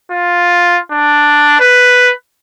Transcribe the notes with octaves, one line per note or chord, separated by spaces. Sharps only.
F4
D4
B4